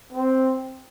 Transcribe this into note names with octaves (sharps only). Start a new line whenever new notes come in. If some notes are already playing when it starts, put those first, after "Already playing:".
C4